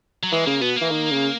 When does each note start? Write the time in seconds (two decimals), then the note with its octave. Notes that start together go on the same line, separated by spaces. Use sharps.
0.23 F#3
0.32 E3 G#3
0.46 C#3 A#3
0.61 B2 B3
0.76 A#3
0.81 E3
0.91 D#3
1.11 C#3